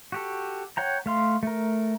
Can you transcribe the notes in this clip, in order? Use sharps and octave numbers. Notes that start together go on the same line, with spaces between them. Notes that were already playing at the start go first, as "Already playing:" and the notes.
F#4 G4 A4
C#5 F#5 G5 A#5
A3 F5 C6
A3 A#4